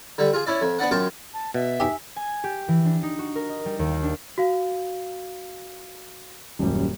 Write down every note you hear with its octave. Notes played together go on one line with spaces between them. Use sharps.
D3 G3
F4 G#4
C#4 E4 D5
F2
B3 D4 D5 F#5
F#2 F4 G5 A5 D6
A5
B2 E5
D#4 G4 G#5 E6 B6
G#5
G4
E3
D4
D#4
F#4
A#4
D#5
G3
D#2
F5
D4
F#4 F5
D#1 F#2 G3